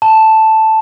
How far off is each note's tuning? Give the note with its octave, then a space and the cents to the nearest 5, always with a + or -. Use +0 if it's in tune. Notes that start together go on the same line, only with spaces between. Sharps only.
A5 +0